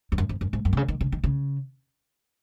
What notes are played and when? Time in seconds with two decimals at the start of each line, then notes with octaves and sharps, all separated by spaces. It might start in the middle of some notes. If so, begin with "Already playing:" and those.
0.12 F2
0.18 F#2
0.29 F2
0.41 F#2
0.53 G#2
0.65 F#2
0.73 C3
0.77 C#3
0.88 D#3
1.01 C#3
1.12 D#3
1.24 C#3